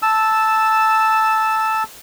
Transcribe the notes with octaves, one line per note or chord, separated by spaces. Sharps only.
A5 E6